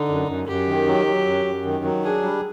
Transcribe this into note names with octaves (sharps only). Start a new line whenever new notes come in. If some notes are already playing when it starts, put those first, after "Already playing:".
Already playing: D3 D#4
F#2
F#2
F#2 G4
D#3
F#3
F#3
F#2
F#2
D#3
F#3
D4 G#4
G3